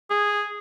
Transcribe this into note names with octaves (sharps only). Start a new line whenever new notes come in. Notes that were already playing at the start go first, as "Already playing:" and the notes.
G#4